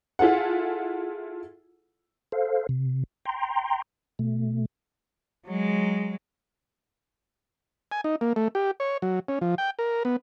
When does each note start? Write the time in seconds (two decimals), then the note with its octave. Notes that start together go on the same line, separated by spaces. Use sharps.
0.19 E4 F4 G#4 A4 F#5
2.32 A4 C5 F5
2.69 C3
3.25 G5 A#5 C6
4.19 B2 A3
5.45 F#3 G#3
7.92 G#5
8.04 D#4
8.21 A#3
8.36 A3
8.55 G4
8.80 C#5
9.02 F#3
9.28 C#4
9.41 F3
9.58 G5
9.79 A#4
10.05 B3